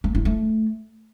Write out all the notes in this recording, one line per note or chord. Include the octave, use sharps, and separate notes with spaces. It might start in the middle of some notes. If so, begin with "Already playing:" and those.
A#3
E4
A3